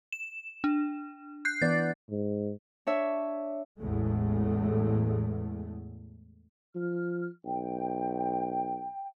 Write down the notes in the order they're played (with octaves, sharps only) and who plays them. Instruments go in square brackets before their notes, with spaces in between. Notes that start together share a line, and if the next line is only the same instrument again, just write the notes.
[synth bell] E7
D4
F#6 G6 C7
[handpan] E3 B3 D5 [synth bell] A6
[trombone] G#2
[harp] D4 C#5 E5
[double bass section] A1 E2 A2 G#3 A3
[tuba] F3 [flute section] F6
[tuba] B1 [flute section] G5